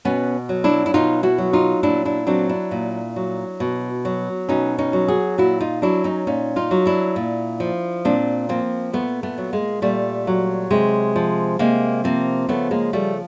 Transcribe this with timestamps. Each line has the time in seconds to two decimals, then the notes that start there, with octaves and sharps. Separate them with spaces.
0.05 B2 B3 C#4
0.49 F#3
0.64 D4 E4
0.86 E4
0.94 B2 D#4 F4
1.23 E4 F#4
1.38 F#3
1.53 D#4 F4
1.83 A#2 D4 E4
2.05 D4 E4
2.27 F#3 C4 D4
2.49 D4 E4
2.71 A#2
3.16 F#3
3.60 B2
4.05 F#3
4.49 B2 C#4 D#4
4.78 C#4 D#4
4.93 F#3
5.08 F#4 G#4
5.38 A#2 E4 F#4
5.60 D#4 F4
5.82 F#3 D4 E4
6.04 C#4 D#4
6.27 A#2 C#4 D#4
6.56 D#4 F4
6.71 F#3
6.86 D4 E4
7.16 A#2
7.60 F3
8.05 A#2 C4 D4
8.49 F3 A#3 C4
8.93 A#2 A3 B3
9.23 A3 B3
9.38 F#3
9.53 G#3 A#3
9.82 A#2 G3 A3
10.27 F#3
10.70 C3 G#3
11.16 F3
11.59 C3 G#3 A#3
12.04 F3 A#3 C4
12.49 C#3 A3 B3
12.71 G#3 A#3
12.93 F3 G3 A3